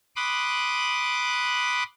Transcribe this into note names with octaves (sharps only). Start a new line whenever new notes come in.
B5 C6 D6 D#6 F#6